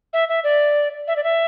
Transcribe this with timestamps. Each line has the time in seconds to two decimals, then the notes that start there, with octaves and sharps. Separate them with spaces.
0.13 E5
0.29 E5
0.44 D5
1.08 E5
1.16 D5
1.24 E5